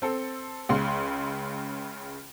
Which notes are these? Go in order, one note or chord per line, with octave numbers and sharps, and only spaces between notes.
C4 A4
C#2 C#3 C6